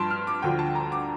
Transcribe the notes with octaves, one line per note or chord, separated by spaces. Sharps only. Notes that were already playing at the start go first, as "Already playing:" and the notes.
Already playing: G2 F3 A5 C6
F6
D6
D2 D3 F3 G5
A5
A#5
D6